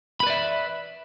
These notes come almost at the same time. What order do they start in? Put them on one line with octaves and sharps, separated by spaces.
B5 B4 D5 E5